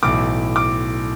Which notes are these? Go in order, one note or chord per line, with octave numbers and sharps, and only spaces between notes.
B1 A2 E3 D6
D6